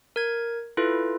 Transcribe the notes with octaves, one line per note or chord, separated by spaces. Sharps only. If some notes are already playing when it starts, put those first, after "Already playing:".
A#4 G#6
E4 F4 A4 B4